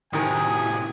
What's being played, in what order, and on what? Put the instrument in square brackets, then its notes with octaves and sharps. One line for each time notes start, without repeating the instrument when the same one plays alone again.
[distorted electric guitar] A2 C3 [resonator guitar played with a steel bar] D#3 A#4 [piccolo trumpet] G#5 [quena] D#6